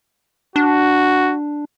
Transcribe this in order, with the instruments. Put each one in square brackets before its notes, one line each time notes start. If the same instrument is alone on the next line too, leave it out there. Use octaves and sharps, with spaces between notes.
[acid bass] D4 [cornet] F#4